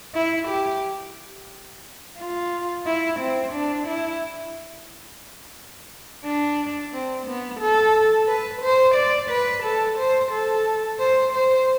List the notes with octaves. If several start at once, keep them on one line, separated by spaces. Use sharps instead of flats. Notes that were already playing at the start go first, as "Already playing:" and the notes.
E4
G4
F4
E4
C4
D4
E4
D4
C4
B3
A4
B4
C5
D5
B4
A4
C5
A4
C5
C5